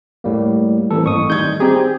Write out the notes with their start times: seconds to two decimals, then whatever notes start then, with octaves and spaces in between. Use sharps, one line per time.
0.24 A2 G3 A#3
0.91 E3 A#3 C4 A4
1.06 A1 C#6 D#6
1.30 D#3 G3 G6 G#6
1.60 C4 G4 G#4 A#5